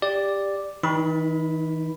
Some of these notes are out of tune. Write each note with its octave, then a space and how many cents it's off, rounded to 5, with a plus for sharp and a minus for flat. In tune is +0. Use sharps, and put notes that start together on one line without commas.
G4 +15 D5 +0
E3 -40 D#4 +0 B5 +0